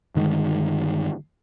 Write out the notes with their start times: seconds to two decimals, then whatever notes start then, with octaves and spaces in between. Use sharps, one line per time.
0.15 G2 D3 D#3 G#3